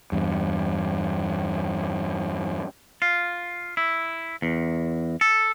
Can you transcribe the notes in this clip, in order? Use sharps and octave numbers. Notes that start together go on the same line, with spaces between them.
E2 G2
F4
E4
E2
A4